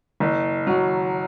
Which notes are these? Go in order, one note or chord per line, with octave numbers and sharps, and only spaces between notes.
F#1
F#3